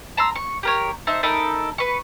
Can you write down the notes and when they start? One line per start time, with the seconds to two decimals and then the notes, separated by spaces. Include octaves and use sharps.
0.17 A5 A#5 C6 E6
0.36 C#6
0.63 G4 A#4 C#5
1.07 D#4 C5 E5 A5
1.23 D#4 A4 A#4 B5
1.78 B4 C#6